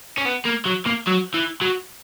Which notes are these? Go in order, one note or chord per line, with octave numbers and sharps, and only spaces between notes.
C#4
B3
A#3
F#3
A#3
F#3
E3
F#3